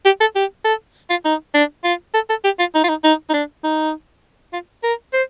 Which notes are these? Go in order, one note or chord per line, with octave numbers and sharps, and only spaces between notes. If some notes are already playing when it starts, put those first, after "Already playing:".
G4
A4
G4
A4
F4
D#4
D4
F4
A4
A4
G4
F4
D#4
F4
D#4
D#4
D#4
D4
D#4
F4
A#4
C5